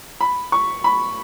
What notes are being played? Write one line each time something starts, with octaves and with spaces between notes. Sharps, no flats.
B5
C#6
B5